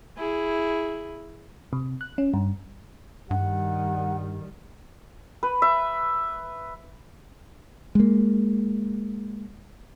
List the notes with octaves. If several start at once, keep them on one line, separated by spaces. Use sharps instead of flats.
E4 G#4
C3
F#6
C#4
G2
G2 D#3 G3 F#5
B4
E5
G#3 A#3